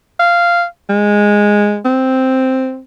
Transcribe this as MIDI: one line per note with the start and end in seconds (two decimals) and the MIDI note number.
0.20 0.64 77
0.89 1.79 56
1.85 2.80 60